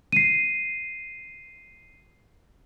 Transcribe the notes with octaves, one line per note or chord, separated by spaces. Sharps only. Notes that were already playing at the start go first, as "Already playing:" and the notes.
C7 D#7